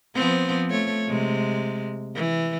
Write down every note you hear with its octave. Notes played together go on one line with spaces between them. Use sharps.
F3 B3 C4
F3 A3 C#5
C3 G#3
E3